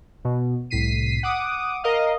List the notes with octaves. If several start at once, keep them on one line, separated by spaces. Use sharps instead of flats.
B2
C2 A2 B6 C7 D#7
F#5 D6 D#6
A#4 D#5 F5